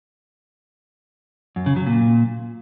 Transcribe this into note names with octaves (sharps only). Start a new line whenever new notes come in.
F#2
C#3
F#3
A#2